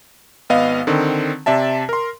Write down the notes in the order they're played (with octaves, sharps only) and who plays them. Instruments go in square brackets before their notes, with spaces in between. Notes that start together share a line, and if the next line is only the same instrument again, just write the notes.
[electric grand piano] G#1 B3 D#5 F5
D3 D#3 C4
C3 D5 E5 A5
A#4 C6